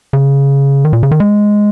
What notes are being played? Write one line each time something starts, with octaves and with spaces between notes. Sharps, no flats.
C#3
D#3
A#2
C#3
D#3
G#3